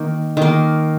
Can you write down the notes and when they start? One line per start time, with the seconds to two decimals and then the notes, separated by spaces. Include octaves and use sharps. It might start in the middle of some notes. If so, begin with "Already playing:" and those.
Already playing: D#3 A#3
0.37 D#3 A#3